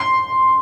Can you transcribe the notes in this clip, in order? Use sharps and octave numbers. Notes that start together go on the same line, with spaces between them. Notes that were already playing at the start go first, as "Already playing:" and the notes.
Already playing: C6